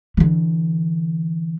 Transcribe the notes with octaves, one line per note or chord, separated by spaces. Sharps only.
D3 E3